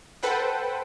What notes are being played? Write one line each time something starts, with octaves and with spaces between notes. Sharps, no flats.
A4 B4 C5 F#5 G5